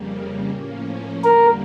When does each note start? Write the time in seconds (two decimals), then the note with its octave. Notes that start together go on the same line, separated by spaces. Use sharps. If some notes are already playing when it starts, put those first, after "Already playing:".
Already playing: F2 C#3 G3 A#3
0.48 A2 F3 A#3 C#4
1.24 E2 D3 G3 A#3 A#4